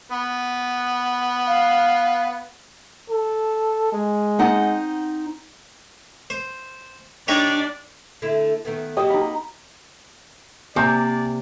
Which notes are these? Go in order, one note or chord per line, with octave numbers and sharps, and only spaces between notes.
B3
F5
A4
G#3
C4 D#4 F#5
C5
D4 D#4 G4 C#5 D5
D3 A3 E4
D#3 A3 B3
A#3 F#4 G4 D#5
D#4 B5
C3 A#3 D5 G#5 A#5 D6 G6